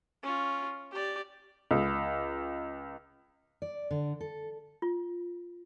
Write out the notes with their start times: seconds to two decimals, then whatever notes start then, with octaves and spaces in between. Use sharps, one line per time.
0.23 C#4 F4
0.92 G4 D5
1.71 C#2
3.62 D5
3.91 D3
4.21 A4
4.82 F4